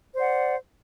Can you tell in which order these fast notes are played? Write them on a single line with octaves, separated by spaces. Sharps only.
C5 D5 F#5